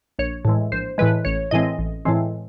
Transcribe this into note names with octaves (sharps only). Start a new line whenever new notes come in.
A#1 C#5
A2 E3 G#3
A#1 C5
A2 E3 G#3 B4
A1 C#5
A2 E3 G#3 C4 D#5
A1
A2 E3 G#3 C4